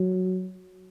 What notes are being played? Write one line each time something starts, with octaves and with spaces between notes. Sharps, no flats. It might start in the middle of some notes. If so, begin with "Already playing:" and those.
Already playing: F#3